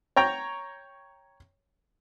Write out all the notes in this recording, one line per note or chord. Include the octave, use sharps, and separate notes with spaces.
C#5 G5 A#5